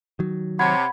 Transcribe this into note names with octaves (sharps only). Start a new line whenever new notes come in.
D#3 F#3
C3 C#5 F#5 B5 G#6